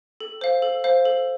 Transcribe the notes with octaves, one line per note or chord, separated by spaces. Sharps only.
A4
C5 F5
A4
C5 F5
A4